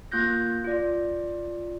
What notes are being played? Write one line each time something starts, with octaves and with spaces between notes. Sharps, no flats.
A#3 F4 F#6 G6 A#6
F4 D5